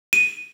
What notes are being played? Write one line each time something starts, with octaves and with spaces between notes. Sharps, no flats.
D#7